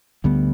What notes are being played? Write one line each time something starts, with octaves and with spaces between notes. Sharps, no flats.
D2 D3 G3 B3